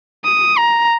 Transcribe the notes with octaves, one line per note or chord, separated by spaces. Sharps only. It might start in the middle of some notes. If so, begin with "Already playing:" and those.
D#6
A#5